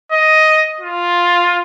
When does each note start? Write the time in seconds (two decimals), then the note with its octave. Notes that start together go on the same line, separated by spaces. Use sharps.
0.12 D#5
0.80 F4